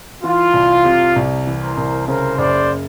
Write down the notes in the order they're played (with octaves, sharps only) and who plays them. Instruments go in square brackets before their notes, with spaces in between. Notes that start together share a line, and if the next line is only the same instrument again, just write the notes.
[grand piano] E3 [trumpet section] F4
[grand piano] C2
C3
C2
E3
[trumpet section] A#4 C5
[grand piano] C2
[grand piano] C#3 [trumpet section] A#4 C5
[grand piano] F#1 [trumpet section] C5 D5